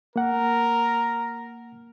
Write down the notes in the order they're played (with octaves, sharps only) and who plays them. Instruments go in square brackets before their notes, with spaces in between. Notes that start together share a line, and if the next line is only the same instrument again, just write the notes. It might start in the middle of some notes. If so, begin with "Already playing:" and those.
[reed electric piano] A#3 F#5 [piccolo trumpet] A#4